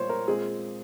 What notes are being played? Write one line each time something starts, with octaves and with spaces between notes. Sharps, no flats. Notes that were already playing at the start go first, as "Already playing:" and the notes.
Already playing: A#2 G3 A#3 C5 C#5
A#4
A#2 G#3 C4 G#4